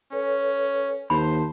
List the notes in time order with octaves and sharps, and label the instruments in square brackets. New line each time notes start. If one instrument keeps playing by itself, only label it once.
[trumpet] C#4 [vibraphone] A4 B4 C#5
[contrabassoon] D#2 [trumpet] C5 [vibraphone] A5 C6 [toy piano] B5